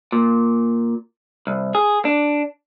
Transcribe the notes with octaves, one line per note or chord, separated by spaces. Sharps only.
A#2
C2
G#4
D4